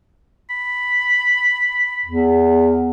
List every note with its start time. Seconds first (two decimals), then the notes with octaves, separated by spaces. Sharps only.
0.50 B5
2.06 E2